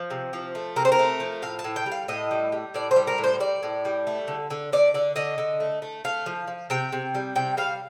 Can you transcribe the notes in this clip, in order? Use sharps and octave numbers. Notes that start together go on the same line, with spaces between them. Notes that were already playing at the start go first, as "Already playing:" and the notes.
Already playing: F3
C3
F3
A3
C3 A#4
C5
A#4
A3
F3
A2 F5
A5
A2
G5
G3
F5
A2 D#5
G3
G3
A2 D5
C5
G3
A#4
A2
C5
G3 D5
A2
G3
A3
D3
D3
D3 D5
D3 D5
D3 D#5
D3
A3
A3
A3 F5
F3
F3
C3 G5
C3
G3
C3 G5
G3 F5